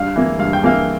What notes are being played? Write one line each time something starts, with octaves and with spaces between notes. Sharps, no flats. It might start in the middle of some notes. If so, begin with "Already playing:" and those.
Already playing: G2 F5
E3 A#3
G2 F5
G5
E3 A#3 F5